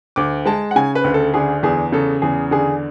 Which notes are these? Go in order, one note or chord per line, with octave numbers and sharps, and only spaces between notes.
D2 D6
G#3 A5
F#5
C#3 G#5
B4
D2
A4
D3 G#4
E2 G#4
C#3 A4
E2 G#4
D3 G#4